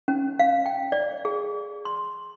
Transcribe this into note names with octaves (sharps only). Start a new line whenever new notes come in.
C#4
F5
G5
D5
G#4
C6